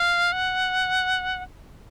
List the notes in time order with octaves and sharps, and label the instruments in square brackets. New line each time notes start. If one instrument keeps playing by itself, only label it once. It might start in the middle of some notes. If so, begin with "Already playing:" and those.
Already playing: [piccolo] F5
F#5